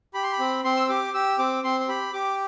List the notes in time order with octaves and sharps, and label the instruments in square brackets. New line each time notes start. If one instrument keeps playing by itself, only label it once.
[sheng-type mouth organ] G4 B5
C6
B5
C4
C4 C6
E6
G4 D6
G4 E6
C4 D6
C4 C6
C6
G4 B5
G4 D6